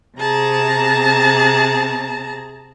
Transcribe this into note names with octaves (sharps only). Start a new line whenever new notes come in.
C3 G#4 A5 A#5